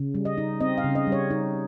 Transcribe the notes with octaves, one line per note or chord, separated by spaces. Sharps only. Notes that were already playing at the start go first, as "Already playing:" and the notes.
Already playing: C#3
G3
D#5
D#4
C4 D#5
F5
C#3
D#5
G3
C#5
D#4